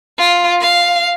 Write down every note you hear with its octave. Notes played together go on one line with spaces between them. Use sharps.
F4
F5